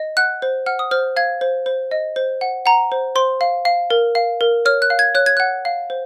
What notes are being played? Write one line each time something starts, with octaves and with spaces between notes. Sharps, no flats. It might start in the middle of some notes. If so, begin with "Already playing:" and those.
Already playing: D#5
F#5 F#6
C5
F#5 F6
D#6
C5 F6
F5 G#6
C5
C5
D#5
C5
F#5
F#5 A#5
C5
C5 C6
F5
F5
A#4
F5
A#4
C#5 F6
F#6
F5
G#6
C#5 F#6
G#6
F#5 F#6
F5
C5